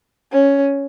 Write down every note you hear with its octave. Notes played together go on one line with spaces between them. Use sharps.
C#4